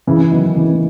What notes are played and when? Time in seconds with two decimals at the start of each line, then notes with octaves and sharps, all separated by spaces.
0.07 C#3 E3
0.32 D#3 F#3 B3
0.56 C#3 E3
0.73 A#3